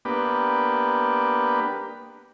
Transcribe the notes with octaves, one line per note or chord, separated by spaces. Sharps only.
A#3 B3 D4 G4 B4